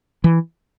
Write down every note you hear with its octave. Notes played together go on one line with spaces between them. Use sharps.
E3